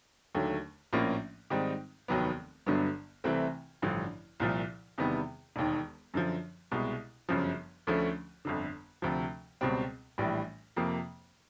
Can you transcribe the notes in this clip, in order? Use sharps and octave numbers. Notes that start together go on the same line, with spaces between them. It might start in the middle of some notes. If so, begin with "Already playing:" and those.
D#2 D3 F#3 A3
A#1 A2 F3 A#3 C#4
G#2 D#3 G3 C4 D#4
F1 D#2 D#3 F#3 B3
G1 G2 D3 F#3 B3
C2 C3 E3 A3 C4
A1 G2 D3 F3
C2 A#2 F3
E2 C3 D#3 G3 B3
E1 D#2 D#3
F#2 D3 F3
C2 B2 G#3
G1 F#2 C#3 F3
D2 D3 F3 A3 C#4
G1 F2 D3
D2 C3 F3
C#2 B2 G3 C4
A#1 A2 E3 G3
F2 C3 F3 A#3